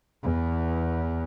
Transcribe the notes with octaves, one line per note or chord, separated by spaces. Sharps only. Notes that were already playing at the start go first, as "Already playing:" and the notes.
E2